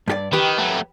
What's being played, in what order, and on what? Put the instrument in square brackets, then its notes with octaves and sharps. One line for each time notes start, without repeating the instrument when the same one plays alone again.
[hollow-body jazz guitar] G2 G4 D5
[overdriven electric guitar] D#3 [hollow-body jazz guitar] G4 B4
[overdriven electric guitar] F#3 A3